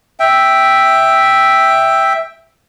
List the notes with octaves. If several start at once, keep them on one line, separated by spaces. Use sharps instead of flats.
E5 G5